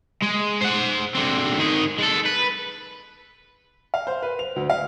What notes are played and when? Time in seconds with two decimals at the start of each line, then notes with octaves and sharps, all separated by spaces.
0.22 G#3
0.61 C5 F#5
1.15 D3 C4
1.59 D#3 G#4
1.99 G#3 A4
2.26 B4
3.94 F5
4.07 C5
4.22 B4
4.39 F7
4.56 D2
4.70 F5